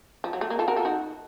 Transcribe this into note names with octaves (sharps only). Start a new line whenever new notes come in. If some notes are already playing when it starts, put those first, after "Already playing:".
F3
F#3
A3
A#3
F4 A4
F#4 A#4
F4 A4
D#4 F#4